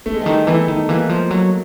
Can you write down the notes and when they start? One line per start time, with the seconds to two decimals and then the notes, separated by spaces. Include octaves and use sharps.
0.06 C#3 A3
0.14 G#3
0.21 D#3 G3 A3
0.47 E3 A3 B3
0.68 D#3
0.88 E3 G#3 A#3
1.09 F3
1.31 F#3